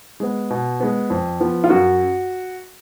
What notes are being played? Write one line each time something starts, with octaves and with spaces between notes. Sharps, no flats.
G#3 B3
B2
G#3 B3
F2
F3 B3
F4
F#2 F#4